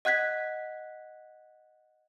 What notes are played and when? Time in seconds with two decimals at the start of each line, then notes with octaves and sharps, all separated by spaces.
0.05 D#5 F#5 F#6 G#6 B6